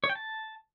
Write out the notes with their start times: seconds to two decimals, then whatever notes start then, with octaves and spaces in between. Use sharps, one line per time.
0.04 C#5
0.09 G5
0.15 A5